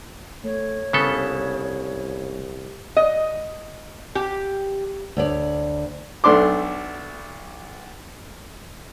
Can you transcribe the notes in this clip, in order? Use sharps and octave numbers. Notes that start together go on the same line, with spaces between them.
A3 C#5
C2 C#3 B3 A4
D#5
G4
D2 C#5 D5
B1 A3 D4 C6 D6